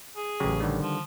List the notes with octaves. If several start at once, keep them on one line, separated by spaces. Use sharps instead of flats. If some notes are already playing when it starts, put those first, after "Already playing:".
G#4
A1 C#3 F#3 G4
D3 D#3 G3
F3